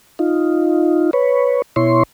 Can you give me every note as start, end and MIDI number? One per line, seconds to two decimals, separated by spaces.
0.19 1.11 63
0.19 1.11 65
1.13 1.62 71
1.13 1.62 73
1.76 2.03 47
1.76 2.03 64
1.76 2.03 73
1.76 2.03 84